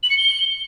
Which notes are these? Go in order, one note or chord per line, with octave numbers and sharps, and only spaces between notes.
F#7
C#7
G7